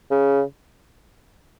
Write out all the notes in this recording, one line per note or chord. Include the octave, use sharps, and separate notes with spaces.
C#3